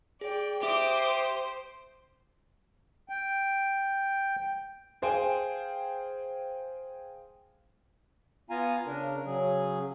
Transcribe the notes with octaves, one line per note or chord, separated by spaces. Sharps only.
G#4 D5 G5
G4 C5 E5 D6 D#6
G5
G#4 C5 F5 G5 G#5
B3 F4 F5 G#5 A#5
C#3 D4 A#4
C#3 F#3 G#4